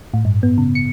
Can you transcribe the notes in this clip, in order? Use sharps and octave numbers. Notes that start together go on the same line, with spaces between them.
A2
G2
B3
C#3
C#7